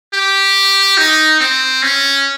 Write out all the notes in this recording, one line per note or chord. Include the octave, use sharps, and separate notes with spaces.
G4
D#4
C4
C#4